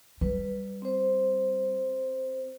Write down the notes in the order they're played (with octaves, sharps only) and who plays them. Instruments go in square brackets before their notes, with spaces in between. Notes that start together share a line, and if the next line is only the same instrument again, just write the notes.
[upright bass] G3 [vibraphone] B4
[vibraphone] C4 C5